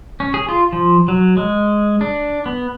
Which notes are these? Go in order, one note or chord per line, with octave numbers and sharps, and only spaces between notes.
C#4
G#4
F4
F3
F#3
G#3
D4
B3